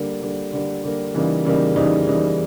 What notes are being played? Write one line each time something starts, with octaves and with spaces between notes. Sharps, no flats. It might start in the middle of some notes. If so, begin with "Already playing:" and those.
Already playing: D3 G3 A#3
D3 G3 A#3
D3 G3 A#3
D3 G3 A#3
C#3 E3 G3 A#3 D#4
C#3 E3 G3 A#3 D#4
C#3 E3 G3 A#3 D#4
C#3 E3 G3 A#3 D#4